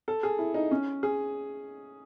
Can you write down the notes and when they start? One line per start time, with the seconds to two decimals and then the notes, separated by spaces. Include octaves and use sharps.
0.08 A4
0.23 G#4
0.39 E4
0.54 D#4
0.71 C#4
1.03 G#4